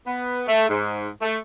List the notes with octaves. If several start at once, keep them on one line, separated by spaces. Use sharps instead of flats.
B3
A3
G#2
A3